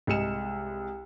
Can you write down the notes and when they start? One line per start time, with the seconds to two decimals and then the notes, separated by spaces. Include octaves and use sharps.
0.07 C2 G#3 C#7 E7